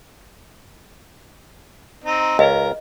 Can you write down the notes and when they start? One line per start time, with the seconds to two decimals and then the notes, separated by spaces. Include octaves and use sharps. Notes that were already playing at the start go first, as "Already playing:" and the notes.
2.04 C4 D#4
2.39 C#2 A#4 D#5